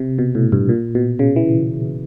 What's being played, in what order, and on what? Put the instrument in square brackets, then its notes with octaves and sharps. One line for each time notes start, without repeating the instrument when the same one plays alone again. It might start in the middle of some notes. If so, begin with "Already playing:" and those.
Already playing: [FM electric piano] C3
B2
A2
G2
A#2
B2
C#3
E3